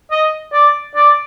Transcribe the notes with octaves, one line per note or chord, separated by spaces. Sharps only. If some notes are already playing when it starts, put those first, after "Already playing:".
D#5
D5
D5